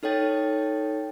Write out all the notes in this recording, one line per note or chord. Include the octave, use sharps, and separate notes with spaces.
D#4 A4 C#5 G5 A6